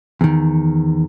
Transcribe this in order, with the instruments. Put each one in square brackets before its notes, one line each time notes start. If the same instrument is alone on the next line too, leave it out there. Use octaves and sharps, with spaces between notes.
[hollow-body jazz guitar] E2 D#3